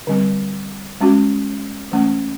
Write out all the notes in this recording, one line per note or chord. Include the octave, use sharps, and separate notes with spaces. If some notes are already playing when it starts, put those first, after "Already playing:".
D3 G3 C4
G#3 C#4 F#4
E3 A3 C#4